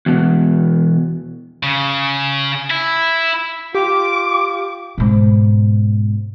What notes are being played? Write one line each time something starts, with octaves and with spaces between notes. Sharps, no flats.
E2 B2
C#3
E4
F4 G4 D6
G#2 B2